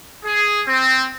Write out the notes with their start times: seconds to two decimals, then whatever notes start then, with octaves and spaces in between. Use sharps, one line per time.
0.25 G#4
0.68 C4